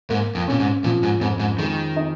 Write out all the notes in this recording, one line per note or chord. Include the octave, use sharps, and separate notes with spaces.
G#2 A#3
F2
A#2 C#4
G#2
A#2 F3
G#2
F2 G#2
G#2
D#3 G#3
D#4